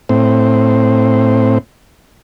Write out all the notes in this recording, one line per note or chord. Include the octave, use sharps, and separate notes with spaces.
A2 C4